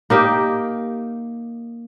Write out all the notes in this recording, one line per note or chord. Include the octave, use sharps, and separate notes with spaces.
A#3 D#4 G4